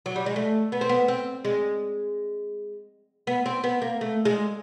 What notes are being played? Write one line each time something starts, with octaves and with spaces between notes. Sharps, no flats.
F#3
G3
G#3
A3
B3
C4
B3
C4
G#3
B3
C4
B3
A#3
A3
G#3